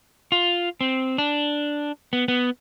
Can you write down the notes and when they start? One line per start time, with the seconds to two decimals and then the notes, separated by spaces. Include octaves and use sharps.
0.32 F4
0.81 C4
1.18 D4
2.13 B3
2.28 B3